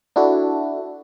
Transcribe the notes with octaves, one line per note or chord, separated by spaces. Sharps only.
D4 E4 F#4 A4